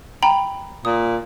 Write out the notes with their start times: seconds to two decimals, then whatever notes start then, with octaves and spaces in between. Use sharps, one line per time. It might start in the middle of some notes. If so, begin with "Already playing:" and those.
0.23 G5 A#5 B5
0.85 A#2 D#6